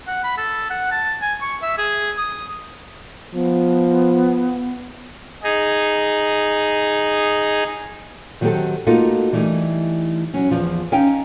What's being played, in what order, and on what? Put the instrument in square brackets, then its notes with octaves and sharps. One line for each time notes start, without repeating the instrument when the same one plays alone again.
[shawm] F#5
B5
A4
F#5
A5
G#5
C#6
E5
G#4
D#6
[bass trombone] F3 [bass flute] B3
[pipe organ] D#4 G#4
[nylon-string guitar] D#3 F#3 B3 C4 G4 A4
A3 A#3 D#4 F4 F#4 A4
E3 G3 A3 D#4
F#3 C#4
E2 F3 F4
C#4 D#4 F5 G5